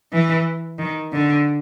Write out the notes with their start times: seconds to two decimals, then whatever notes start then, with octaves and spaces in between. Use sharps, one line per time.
0.12 E3
0.79 D#3
1.12 D3